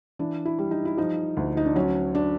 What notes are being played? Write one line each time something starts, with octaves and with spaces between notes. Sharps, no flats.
E3 D4
E4
G3
D#4
E4
F3 D#4
D2
D#4
D4
F#3 C#4
D4